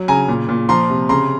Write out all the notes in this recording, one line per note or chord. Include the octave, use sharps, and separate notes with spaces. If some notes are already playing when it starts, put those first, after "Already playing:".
Already playing: F#3
C#3 G#5 A#5
A#2
A#2
F3 A#5 C6
C3
C#3 A#5 C6